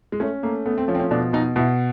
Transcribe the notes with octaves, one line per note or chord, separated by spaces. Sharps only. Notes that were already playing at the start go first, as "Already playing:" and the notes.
G#3
A3 C#4
A3 A#3
A3 B3
C4
F3 C#4
C4
C#4
B2 D4
B2 D#4
B2 E4